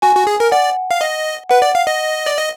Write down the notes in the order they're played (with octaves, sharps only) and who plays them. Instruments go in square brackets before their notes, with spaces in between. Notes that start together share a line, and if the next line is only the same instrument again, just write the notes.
[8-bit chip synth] F#4 [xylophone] G#5
[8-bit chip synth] F#4
G#4
A#4
[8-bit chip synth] D5 [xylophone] F#5
[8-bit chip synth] F5
D#5
[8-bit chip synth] B4 [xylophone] F#5
[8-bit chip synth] D5
F5
D#5
D5
D#5